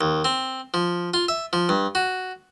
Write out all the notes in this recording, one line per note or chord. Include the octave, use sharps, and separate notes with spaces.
D#2
C4
F3
F4
E5
F3
G2
F#4